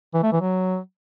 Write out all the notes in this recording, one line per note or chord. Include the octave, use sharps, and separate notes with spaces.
E3
A3
E3
F#3